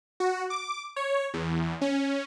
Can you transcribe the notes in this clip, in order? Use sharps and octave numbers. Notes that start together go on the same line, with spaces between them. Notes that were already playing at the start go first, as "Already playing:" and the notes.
F#4
D6
C#5
E2
C#4